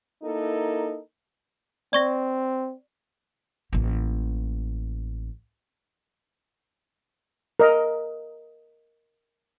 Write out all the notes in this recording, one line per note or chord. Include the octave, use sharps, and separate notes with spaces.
A#3 D#4 E4 A4 A#4
C4 D5 C#6 A#6
A1 A#3
A#4 D#5